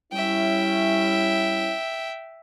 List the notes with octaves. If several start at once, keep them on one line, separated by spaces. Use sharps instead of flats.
G3 C#4 E4 E5 G5